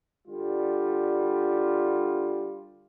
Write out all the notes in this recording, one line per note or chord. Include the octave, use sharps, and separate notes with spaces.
D3 G3 F4